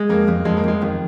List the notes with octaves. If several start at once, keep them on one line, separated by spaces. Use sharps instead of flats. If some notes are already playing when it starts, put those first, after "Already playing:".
Already playing: G#3
F2 A#3
F2
F2 G#3
A#3
F2 G#3
F2 D#3